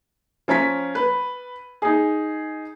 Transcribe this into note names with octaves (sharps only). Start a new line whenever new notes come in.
F3 C#4 A#5 B6
B4
D#4 G#4